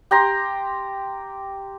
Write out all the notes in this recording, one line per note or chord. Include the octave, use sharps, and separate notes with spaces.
G4 G5 A#5 C6